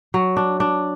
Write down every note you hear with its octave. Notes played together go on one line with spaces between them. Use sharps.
F#3
D4
D4